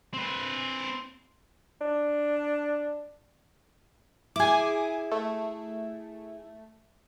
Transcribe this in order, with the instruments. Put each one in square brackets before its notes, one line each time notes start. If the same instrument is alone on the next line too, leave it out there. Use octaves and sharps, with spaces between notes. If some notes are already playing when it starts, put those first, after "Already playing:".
[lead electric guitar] C4 B4
[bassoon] D4
[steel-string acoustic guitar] E4 G#4 [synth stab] G#5 D6
[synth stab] A3